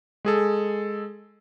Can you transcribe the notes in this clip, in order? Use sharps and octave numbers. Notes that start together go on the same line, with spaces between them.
G#3 G#4 A4